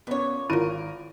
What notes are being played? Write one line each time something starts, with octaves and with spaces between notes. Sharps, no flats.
A#2 B3 C#4 C#5
G#1 E4 F4 A#4 D#7